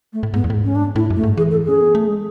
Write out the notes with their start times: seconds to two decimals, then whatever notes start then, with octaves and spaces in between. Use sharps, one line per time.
0.13 A3
0.23 A2
0.34 G#2 B3
0.44 E2
0.50 A2
0.54 G#2
0.64 C#4
0.75 D4
0.96 A2 E4
1.10 F#2
1.16 A3
1.23 G#2
1.37 E3 G#4
1.51 A4
1.65 C#4 G#4
1.81 B3
1.95 A3
2.08 G#3